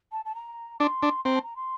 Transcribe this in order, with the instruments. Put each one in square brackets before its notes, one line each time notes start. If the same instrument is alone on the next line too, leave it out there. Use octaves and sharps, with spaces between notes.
[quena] A5
A5
A#5
[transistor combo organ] D4 [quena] D6
[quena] C6
[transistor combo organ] D4
[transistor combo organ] C4 [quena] A#5
[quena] A5
A#5
C6